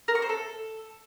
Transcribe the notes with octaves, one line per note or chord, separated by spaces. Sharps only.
A#4
C#6
C5
A4